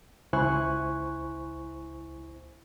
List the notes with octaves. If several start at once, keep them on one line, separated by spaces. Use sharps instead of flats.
C#2 E4 C5 G#5 C#6 F#6